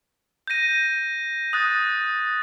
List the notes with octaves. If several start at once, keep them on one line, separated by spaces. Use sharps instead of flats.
G6 A#6 D#7
D#6 F#6 A6